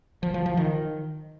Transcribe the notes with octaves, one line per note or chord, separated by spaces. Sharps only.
F3
F3
F3
D#3